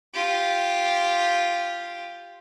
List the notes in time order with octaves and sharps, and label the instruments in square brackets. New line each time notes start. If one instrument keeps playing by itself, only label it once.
[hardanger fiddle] F4 G4